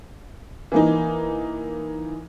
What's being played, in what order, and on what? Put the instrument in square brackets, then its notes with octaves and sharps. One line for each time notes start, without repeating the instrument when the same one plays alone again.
[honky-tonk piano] E3 A#3 D#4